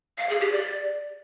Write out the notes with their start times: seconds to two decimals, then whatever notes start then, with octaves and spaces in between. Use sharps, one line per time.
0.18 F5
0.29 G#4
0.41 G4
0.52 D5